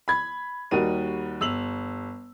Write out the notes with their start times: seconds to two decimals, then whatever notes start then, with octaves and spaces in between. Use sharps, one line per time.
0.08 B5 G#6
0.71 D#2 G3 D#4 F#4 A#4 D#7
1.41 G1 E6 F7 F#7